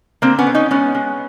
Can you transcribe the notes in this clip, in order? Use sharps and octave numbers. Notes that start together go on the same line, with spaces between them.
D3 A#3 C4
B3 C#4
D3
C#4 D#4
G#3 B3 C#4
G#3